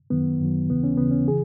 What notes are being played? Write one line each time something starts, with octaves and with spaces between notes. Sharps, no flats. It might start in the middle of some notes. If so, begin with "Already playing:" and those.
F#2 D#3 F#3 B3
F#2 D#3 F#3
D#2 C#3 E3 B3
C#4
D#2 C#3 E3 B3
C#4
C#3 E3 G#4